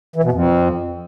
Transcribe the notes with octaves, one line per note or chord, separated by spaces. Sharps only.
E3
B2
F2